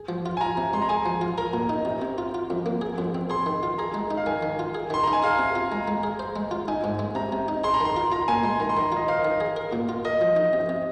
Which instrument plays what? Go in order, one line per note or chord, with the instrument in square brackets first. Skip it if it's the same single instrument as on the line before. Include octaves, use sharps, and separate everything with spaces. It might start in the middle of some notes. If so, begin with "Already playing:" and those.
Already playing: [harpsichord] G#4
F3
F4
[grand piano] G#5
[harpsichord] F4 [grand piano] A#5
[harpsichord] C3
[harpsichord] G#3 [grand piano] C6
[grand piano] A#5
[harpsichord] G#4 [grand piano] G#5
[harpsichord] F3
F4
[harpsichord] A#4 [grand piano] A#5
[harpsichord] A#2
D#4
C3
C3
F4
F4
F2
A#3
G#4
F2
C4
[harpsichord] G#4 [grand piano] C6
[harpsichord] D#3
F4
[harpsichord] G#4 [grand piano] A#5
[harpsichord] G#3
D#4
[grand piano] F5
[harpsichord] D#3 [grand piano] G#5
[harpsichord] D#3
F4
G#4
[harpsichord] D#3 [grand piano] C6
[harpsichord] D#4 [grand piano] A#5
[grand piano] G#5
[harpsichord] G#4 [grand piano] F5
[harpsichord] C3
F4
[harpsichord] G#3 [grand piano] A#5
[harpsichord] G#3
G#4
C5
G#3
F4
[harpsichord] D#4 [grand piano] G#5
[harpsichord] G#2
G#3
[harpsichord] C3 [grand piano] A#5
[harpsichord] C3
D#4
[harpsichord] G#4 [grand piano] C6
[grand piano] A#5
[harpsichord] D#3 [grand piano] C6
[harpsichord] F4
[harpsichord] F4 [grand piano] A#5
[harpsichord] A#2 [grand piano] G#5
[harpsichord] G#3 [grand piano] C6
[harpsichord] D#3 [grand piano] A#5
[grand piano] C6
[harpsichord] D#3 [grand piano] A#5
[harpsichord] F4 [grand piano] D#5
[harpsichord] C5 [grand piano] F5
[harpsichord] D#3
G#4
A#4
A#2
F4
[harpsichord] A#4 [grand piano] D#5
[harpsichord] F3
D#4
C3
C3